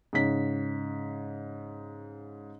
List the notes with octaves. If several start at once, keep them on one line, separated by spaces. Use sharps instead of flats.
G#2 C#3 B6